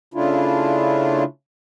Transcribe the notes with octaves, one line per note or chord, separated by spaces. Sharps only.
C#3 A3 D4 E4 F4